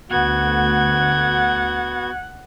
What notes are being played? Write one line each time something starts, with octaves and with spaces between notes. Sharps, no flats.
D2 B3 F#4 F#5 G#6